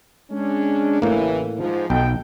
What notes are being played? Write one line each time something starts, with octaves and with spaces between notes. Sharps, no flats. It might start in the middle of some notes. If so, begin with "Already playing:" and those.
G#3 C#4 D4
A1 A2 C#3 E3 A#3
G#2 F3
B1 D#4 A4 G5